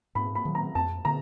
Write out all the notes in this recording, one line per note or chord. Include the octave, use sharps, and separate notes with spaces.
G#2 B5
B5
D#3 F#3
A#5
F2 A5
D3 A#5